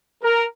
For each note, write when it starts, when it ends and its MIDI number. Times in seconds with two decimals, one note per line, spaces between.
0.23 0.45 70